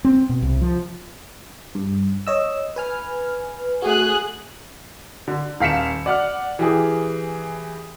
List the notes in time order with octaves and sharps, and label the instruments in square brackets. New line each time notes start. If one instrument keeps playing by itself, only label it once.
[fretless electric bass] C4
B2
C2
F3
[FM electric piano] G2
C#5 D#5 E6
B4 G#5 F6
[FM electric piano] A3 F#4 [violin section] G#4 F#6
[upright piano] D3
D#1 F5 B6 C#7 E7
D5 F#5 F6
E3 G4 G#4